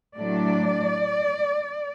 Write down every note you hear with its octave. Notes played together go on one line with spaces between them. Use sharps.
A2 F#3 A3 D4 D5